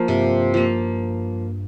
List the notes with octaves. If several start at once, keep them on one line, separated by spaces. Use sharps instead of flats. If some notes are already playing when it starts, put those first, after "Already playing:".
Already playing: F3 A#3
G2 C3
F3 A#3